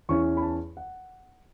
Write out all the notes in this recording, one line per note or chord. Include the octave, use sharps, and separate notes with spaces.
E2 E3 C#4 E4 C#6
B5
A5
F#5